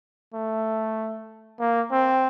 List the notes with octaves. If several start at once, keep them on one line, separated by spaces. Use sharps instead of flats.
A3
A#3
C4